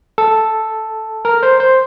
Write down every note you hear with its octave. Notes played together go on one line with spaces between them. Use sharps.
A4
A#4
C5
C5